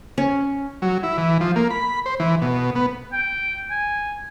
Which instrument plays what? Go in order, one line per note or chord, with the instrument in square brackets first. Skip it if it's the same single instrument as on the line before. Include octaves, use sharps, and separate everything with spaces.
[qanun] C#4
[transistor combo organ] F#3
E4
E3
F3
A#3
B5
C5
E3
B2
B3
[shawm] G5
G#5